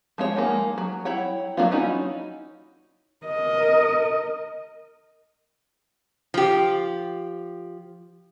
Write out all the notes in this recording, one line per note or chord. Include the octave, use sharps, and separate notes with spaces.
F3 G#3 F4 C#5
G#3 A#3 D#4 F#5
F#3
E4 C#5 F#5 G5
F#3 A#3 D4 E4 F4
C#4 D#4 E4 F#4
A#4 D#5
F3 G4